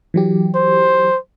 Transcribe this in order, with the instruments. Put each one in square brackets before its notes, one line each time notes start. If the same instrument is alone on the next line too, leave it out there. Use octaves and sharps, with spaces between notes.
[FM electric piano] E3 F#3 G4
[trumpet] C5